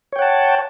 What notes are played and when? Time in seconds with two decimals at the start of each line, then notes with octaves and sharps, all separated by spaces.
0.12 C#5
0.16 G5
0.19 F#5
0.22 A5